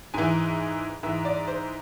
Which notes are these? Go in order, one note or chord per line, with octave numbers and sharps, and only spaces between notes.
G#2 E3 G#5
G#2 E3 E5
D5
C5